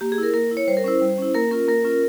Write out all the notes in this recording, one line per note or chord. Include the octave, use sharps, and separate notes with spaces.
A#3 G4
G#4
E4 A#4
A#3 A#4
E4
C#5
G3 C5
A#4
C#4 E4 C5
G3
C#4 E4
A#3 A#4
C#4 F4 A#4
A#3 A#4
C#4 F4